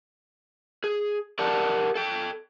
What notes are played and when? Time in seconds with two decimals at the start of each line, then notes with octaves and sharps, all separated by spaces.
0.84 G#4
1.39 G4 A#4 D5 F#5 A5
1.95 A4 G5